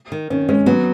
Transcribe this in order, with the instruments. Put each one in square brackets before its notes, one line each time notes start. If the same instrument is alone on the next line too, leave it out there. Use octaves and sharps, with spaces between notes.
[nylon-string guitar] D#3
[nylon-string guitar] D#3 [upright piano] C#4
[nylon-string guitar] G#3 [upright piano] C#4
[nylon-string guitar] F#3 [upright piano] B3